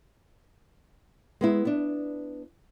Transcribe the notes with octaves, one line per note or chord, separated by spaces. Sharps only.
G#3 B3 E4
B3 D4